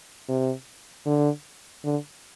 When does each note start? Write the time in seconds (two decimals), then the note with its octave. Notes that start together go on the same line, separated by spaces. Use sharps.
0.29 C3
1.06 D3
1.85 D3